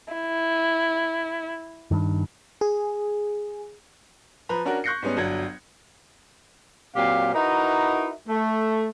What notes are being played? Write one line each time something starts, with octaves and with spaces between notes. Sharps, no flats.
E4
G2 D#3
G#4
F3 B4 A#5 B5
C#4 D4 F#4 A#4
C#6 F#6 G6 A#6 C7 C#7
G#2 G3 B3 C#4
G1 F#3 D4 G#6
A#2 F#3 C4 G4 F5
D#4 E4 F#4 A#4 B4 D#5
A3